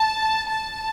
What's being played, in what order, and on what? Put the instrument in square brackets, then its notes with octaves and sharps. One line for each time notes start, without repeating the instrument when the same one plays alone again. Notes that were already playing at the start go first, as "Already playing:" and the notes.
Already playing: [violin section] A5
A5